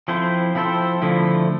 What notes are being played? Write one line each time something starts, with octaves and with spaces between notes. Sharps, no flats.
F3 C4 E4 A4 C5
F3 C4 E4 A4 C5
D3 F3 A3 E4